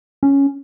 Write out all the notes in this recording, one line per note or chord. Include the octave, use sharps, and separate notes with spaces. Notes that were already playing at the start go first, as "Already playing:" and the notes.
C#4